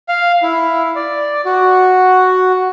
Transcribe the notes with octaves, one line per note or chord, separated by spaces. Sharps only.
F5
E4
D5
F#4